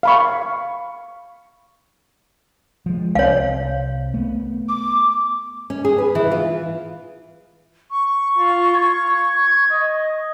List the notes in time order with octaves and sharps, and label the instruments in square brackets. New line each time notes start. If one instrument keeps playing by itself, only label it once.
[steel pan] F5 B5 C#6
[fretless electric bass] F3 G#3
[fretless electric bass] C2 F3 C4 [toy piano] C#5 F5
[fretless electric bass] A3 B3
[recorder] D6
[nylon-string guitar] C#4
G#4
B4
E3
F4
[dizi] C#6
[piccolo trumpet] F4
G#6
D#5